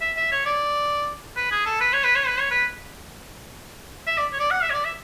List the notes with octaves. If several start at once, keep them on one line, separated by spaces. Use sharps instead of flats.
E5
E5
C#5
D5
B4
G#4
A4
B4
C#5
B4
C#5
B4
C#5
B4
E5
D5
C#5
D5
F#5
E5
C#5
D5
E5